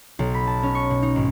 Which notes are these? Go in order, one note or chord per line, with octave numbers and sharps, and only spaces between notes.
B1
B5
A5
C#4
C#6
B2
D#4
G#1